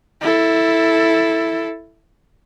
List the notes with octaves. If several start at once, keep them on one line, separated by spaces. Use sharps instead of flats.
E4 A4